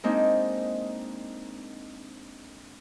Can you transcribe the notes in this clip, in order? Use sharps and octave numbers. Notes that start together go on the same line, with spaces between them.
G#3 A#3 C4 D4 D#4